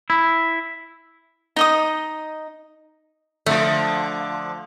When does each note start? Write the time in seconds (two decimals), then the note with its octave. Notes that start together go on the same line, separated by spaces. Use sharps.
0.10 E4
1.56 D#4 D#5 D#6
3.46 D3 F3 A3